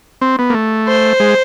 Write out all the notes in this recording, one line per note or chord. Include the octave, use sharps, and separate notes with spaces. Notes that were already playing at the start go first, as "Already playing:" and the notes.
C4
B3
A#3
A3
C5
G#3